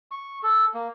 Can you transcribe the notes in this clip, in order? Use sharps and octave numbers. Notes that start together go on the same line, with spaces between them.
C#6
A4
A#3